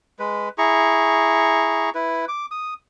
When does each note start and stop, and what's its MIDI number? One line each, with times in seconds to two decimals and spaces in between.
0.19 0.49 56
0.19 0.49 71
0.58 1.90 64
0.58 1.90 68
0.58 1.90 82
0.58 1.90 85
1.95 2.25 64
1.95 2.25 71
2.28 2.46 86
2.51 2.74 87